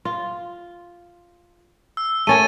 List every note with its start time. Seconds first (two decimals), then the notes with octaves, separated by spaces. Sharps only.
0.05 F4
1.97 E6
2.27 A3 C#4 A#4 G#6 A6 D#7